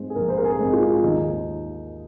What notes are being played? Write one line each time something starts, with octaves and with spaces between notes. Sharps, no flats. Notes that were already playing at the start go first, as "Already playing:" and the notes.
Already playing: G#2 G#3 C4 C5
G#4
A#1 A#4
C5
A#4
G#4
G#2 G#3 C4
F4
D#2 D#4